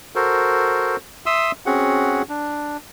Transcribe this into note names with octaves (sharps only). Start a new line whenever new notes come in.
F#4 A4 A#4 C5
E5 C6 D#6 E6
C4 C#4 F#4 G#4 F#5
D4